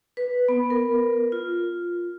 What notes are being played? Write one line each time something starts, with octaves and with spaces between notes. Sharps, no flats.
B4
B3
A#4
F4